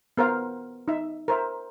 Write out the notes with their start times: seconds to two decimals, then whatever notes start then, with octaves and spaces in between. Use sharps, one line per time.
0.17 B3 A#4 C5 F5
0.88 D#4 E5
1.28 A#4 C5 E5